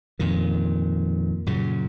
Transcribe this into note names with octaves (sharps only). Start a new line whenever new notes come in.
F2 A#2 D#3
F#2 A#2 C#3